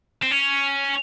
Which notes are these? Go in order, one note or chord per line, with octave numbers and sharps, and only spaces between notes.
C4
C#4